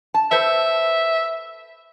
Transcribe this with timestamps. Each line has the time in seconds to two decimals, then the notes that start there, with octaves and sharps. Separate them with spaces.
0.14 A5
0.31 A4 B4 C5 E5